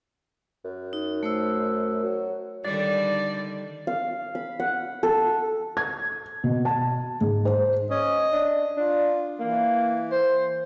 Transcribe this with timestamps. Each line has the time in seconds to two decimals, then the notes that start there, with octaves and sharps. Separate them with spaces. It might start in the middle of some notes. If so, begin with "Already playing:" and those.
0.65 F#2
0.93 D#4
1.23 A3 C5 E6
2.03 F#3
2.64 D3 D#3 G3 D5
3.87 F5
4.35 B5
4.60 F#5
5.03 A4
5.77 G#6
6.44 B2
6.65 A5
7.21 G#2
7.45 C5
7.91 C#4 D#5
8.32 D4
8.77 D4 F4
9.40 E3 A#3
10.12 C5